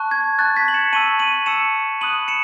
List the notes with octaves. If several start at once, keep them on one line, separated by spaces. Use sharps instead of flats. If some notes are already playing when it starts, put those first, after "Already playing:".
Already playing: A5 C#6 F#6
G#6
A5 C#6 F#6 A6
G#6 B6
F#7
C#7 E7
A5 C#6 E6 D#7 F#7
D#7 F#7
A5 C#6 E6 C#7 E7
B5 D#6 F#6 D#7 F#7
C#7 E7